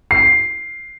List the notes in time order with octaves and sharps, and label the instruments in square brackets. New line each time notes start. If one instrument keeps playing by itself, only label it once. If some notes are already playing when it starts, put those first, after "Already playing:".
[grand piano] C7